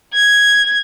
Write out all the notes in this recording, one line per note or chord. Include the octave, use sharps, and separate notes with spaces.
G#6